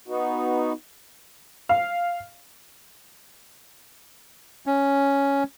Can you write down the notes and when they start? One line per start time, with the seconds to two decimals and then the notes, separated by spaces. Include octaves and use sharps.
0.08 B3 D#4 F#4
1.69 F5
4.66 C#4